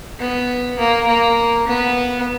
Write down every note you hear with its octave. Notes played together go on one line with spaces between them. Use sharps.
B3
A#3
A#3
B3